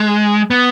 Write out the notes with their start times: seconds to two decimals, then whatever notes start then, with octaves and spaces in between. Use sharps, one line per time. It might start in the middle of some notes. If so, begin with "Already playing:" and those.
Already playing: G#3
0.51 B3